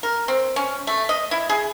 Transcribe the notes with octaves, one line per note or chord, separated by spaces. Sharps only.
A#4
C4
C#4
A3
D#5
E4
G#4